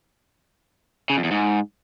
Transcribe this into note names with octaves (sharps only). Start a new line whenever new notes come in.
C#3
F2
E2
G#2